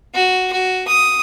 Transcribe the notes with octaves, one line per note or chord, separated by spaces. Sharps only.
F#4
F#4
D#6